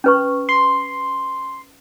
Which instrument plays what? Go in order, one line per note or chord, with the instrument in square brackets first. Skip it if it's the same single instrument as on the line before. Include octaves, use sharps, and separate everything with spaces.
[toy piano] C#4 B4 C#6
[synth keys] C6